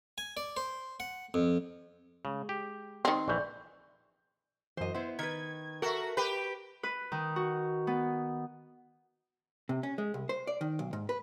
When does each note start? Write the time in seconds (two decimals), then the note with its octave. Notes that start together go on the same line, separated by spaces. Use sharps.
0.18 G#5
0.37 D5
0.57 C5
1.00 F#5
1.34 F2
2.25 C#3 G#3
2.49 G4
3.05 D#3 C4
3.28 A#1 E3 D5 C#6 G6
4.77 F#2 E3 C5 D#5
4.94 B3 E4 C5
5.19 D#3 B4 G#6
5.82 F#4 A4 A#4 E5
6.17 G4 B4
6.83 B4
7.12 D#3
7.36 F#4
7.87 B3
9.69 C3
9.83 C#4
9.98 G#3
10.14 C2
10.29 C5
10.47 D5
10.61 D#3
10.79 B1
10.93 G#2
11.09 B4